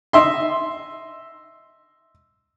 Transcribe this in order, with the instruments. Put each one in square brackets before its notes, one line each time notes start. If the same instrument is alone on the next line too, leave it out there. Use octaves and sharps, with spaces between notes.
[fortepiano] D#5 E5 C6